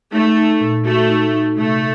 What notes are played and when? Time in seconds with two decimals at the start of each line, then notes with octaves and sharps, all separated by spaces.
0.12 A3 D#4
0.37 D#4
0.61 A#2
0.85 A3 F#4
1.09 D#4
1.34 D#4
1.58 C3 A3